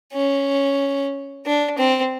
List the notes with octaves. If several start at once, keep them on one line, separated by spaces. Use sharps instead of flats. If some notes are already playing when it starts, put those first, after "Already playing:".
C#4
D4
C4